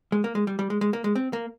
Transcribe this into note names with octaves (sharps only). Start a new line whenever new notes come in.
G#3
A#3
G#3
G3
G3
G#3
G#3
A#3
G#3
C4
A#3